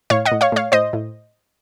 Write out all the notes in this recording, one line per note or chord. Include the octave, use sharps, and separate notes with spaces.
A2 C#5 F5
D#5 F#5
A2
C#5 F5
A2 C#5 F5
A2 C5 D#5
A2